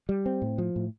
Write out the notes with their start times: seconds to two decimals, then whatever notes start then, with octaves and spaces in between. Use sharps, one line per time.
0.09 G3
0.26 C4
0.42 A2
0.58 F3
0.76 A2